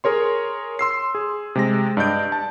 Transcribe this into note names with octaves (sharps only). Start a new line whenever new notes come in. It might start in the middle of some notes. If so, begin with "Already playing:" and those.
G#4 A#4 C#5 C6
C6 E6 C7
G#4
C3 G#3 A#6
G2 D5 D#5 G6 D7
A5